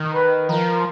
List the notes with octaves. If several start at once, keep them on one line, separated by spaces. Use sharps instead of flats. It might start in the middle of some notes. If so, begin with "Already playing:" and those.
Already playing: D#3
B4
F3 A#4